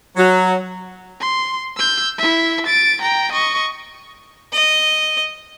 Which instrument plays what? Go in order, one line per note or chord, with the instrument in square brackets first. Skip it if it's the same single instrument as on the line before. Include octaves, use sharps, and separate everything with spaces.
[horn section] F#3
[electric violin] C6
E6 G6
E4 E5
A6 D7
G5 A#5
D#5 C#6
[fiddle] D#5